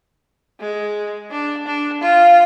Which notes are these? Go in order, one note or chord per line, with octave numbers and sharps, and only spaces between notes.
G#3
D4
D4
F4